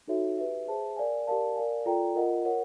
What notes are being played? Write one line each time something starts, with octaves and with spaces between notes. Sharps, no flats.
D#4 F#4 A4 C#5 E5
G4 B4 E5
G#4 C5 E5 A5
A#4 D5 F5 G#5
G4 A#4 D5 F5 A5
A#4 D5 F5 G#5
F4 A4 D5 G5 A#5
F4 A#4 D#5 F#5
A#4 C#5 F#5